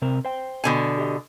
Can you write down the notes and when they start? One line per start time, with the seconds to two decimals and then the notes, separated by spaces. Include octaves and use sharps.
0.02 C3 C4 A#4
0.25 C5 G5
0.64 B2 D3 G#5
0.98 G4 D#5